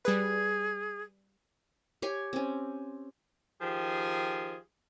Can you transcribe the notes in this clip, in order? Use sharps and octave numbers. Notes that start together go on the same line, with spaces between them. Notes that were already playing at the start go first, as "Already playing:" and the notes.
G3 G#4 B4
G4 C#5 G#5
C4 C#4
D#3 F3 G4 G#4